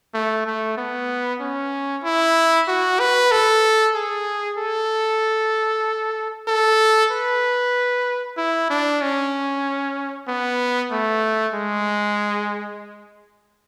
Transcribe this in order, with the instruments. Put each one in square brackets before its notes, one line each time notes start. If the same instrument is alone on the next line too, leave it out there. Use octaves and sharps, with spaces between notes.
[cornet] A3
A3
B3
C#4
E4
F#4
B4
A4
G#4
A4
A4
B4
E4
D4
C#4
B3
A3
G#3